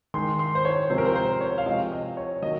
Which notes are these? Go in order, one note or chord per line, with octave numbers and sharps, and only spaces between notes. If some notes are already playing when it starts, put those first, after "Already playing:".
D#3 G#3 C6
C6
C5
C#5
C3 F3 G#3 C5
A#4
C5
C5
C#5
F5
C3 F3 G#3 D#5
D#5
C#5
D#3 F#3 A#3 D#5